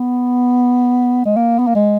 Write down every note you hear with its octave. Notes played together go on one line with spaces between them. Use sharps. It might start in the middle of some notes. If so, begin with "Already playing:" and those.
Already playing: B3
G#3
A#3
B3
A#3
G#3